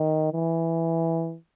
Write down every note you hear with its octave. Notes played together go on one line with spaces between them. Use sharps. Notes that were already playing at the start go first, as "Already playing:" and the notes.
Already playing: D#3
E3